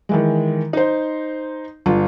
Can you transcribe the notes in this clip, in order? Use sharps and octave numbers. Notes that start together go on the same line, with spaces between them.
D#3 E3 G#3
D#4 C5
G1 F4